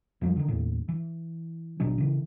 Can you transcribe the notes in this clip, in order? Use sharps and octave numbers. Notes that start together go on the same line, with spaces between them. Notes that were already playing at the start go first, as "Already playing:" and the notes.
F2 F3 G3
D3 D#3
D#2 A2
E3
G#1 B2 F#3 D4
C#3 E3